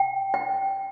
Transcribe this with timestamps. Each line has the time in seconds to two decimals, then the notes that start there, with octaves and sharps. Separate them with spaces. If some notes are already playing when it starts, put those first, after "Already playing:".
Already playing: G5
0.34 G5